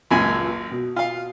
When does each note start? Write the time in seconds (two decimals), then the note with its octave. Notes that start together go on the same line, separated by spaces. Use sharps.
0.11 G#1 C#2 F#2 A#2 G#5
0.71 B2
0.96 F4 F5